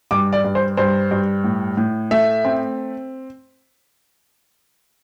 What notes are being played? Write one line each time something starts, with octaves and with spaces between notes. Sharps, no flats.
G2 D6
D5
G2
C5
G2 C5
G2
A2
A2
A3 E5
C4